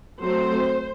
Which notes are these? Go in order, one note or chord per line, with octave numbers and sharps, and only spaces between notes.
F#3 A3 C4 C5